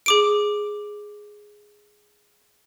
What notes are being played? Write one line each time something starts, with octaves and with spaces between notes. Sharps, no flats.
G#4 D6 D7